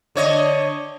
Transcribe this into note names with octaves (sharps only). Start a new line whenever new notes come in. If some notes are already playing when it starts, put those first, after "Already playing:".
D3 C#5 D#5